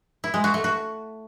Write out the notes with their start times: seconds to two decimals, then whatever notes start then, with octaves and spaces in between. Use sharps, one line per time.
0.24 E4
0.34 G#3
0.44 F#4
0.54 A3
0.64 F#4